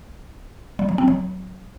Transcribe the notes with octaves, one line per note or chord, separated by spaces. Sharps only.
G3
F#3
C4
F#3